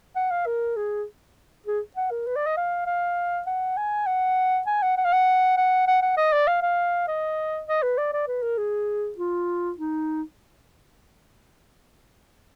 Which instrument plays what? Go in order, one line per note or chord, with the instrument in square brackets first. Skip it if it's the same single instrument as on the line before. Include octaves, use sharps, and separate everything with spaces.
[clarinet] F#5
F5
A#4
G#4
G#4
F#5
A#4
B4
D5
D#5
F5
F5
F#5
G#5
F#5
G#5
F#5
F#5
F5
F#5
F#5
F#5
F#5
D#5
D5
F5
F5
D#5
D#5
B4
D5
D5
B4
A#4
G#4
F4
D#4